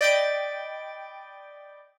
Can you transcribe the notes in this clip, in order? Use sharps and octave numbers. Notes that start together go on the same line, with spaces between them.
D5 D#5 G5 B5 G6 A6